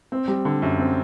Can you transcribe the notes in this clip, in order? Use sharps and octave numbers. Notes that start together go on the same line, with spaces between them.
C4
G3
D3
F#2
C4